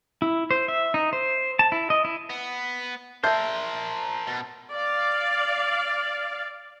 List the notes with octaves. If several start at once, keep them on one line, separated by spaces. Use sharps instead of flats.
E4
C5
E5
D#4
C5
A5
E4
D#5
E4
B3
A#4 C5 E5 A5 G6
B2
D5 F5